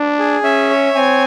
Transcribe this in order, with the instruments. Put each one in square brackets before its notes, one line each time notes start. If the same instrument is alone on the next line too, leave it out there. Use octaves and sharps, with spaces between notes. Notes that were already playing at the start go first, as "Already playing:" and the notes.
Already playing: [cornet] D4
[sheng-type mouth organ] G#4
[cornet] C#4 [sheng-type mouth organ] E5
[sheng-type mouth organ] C#5
[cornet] C4 [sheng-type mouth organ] G#5